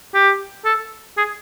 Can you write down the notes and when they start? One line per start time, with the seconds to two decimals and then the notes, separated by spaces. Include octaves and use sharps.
0.14 G4
0.65 A4
1.17 G#4